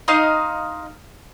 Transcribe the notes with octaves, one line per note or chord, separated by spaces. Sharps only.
D#4 D#5 F5 C6